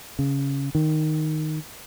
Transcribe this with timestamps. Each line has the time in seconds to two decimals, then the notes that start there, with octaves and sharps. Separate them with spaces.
0.19 C#3
0.75 D#3